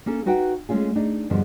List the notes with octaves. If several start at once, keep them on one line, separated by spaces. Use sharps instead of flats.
A#3 C#4 A4
D#4 F#4 B4 F#5 G5
G#3 A3 C4 C#4 F4 G#4
D4 D#4
E2 G2 B2 D3 F3